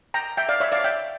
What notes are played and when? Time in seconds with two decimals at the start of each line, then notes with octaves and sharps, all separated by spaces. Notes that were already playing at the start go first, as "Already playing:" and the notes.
0.14 G5 A#5
0.37 E5 G5
0.49 D5 F5
0.60 C#5 E5
0.72 D5 F5
0.84 E5 G5